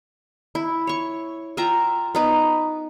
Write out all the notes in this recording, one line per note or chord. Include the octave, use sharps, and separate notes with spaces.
E4
C#5 C#6
F4 E5 G5 A#5
B3 D#4 B4